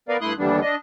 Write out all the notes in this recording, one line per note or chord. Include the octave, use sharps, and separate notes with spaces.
B3 A#4 B4 D5 F5
G2 A3 E4 C6 D#6 F#6
D#2 D3 E3 G3 B3 D4
D4 D#5